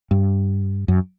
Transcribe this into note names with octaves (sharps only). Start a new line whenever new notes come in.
G2
F#2